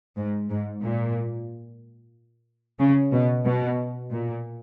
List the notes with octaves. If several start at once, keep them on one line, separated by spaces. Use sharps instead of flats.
G#2
G#2
A#2
C#3
B2
B2
A#2